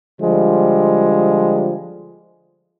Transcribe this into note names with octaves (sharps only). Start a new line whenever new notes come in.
D3 F3 G3 G#3